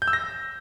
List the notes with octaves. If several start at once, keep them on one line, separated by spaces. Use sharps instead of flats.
G6
E6
A#6